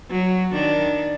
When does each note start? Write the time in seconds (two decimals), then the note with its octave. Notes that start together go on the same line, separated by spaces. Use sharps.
0.11 F#3
0.52 D#3 D4